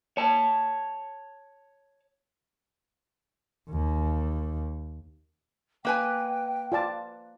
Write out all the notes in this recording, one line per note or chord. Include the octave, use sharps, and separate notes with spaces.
C#5 A5
D#2
A#3 B4 G5 G#5
F4 D5 A5